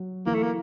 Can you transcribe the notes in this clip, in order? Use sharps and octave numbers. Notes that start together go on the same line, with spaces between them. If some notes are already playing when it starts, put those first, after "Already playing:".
Already playing: F#3
E3 A#3
A3
A#3